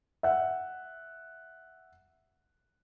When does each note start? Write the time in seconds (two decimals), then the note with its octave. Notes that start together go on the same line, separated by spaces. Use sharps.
0.23 E5 F#5